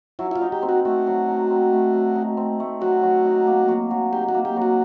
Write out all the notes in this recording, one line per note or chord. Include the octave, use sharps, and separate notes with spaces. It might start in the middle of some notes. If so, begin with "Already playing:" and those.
F#3 E4
E4
F4
D#4
G4
C4
F#4
A3 F#4
F#3
D#4
C4
A3
F#3
D#4
C4
A3
F#3 F#4
F#3
D#4
A#3
F#3
F#3
D#4 G4
F#4
A#3
G4
F#3
F#4